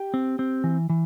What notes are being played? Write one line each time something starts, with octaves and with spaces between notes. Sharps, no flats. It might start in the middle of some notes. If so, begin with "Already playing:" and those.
Already playing: G4 G5
C4
C4
E3
E3